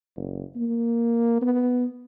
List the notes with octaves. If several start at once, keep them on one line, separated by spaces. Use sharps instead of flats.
F#1
A#3
B3